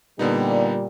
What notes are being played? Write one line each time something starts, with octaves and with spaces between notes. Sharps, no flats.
A#2 D3 G3 B3 D#4